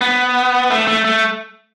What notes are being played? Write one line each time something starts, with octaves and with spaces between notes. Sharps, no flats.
B3
A3
A3
A3